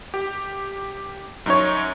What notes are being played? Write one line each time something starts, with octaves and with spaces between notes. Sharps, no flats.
G4
F#2 D#4 C#5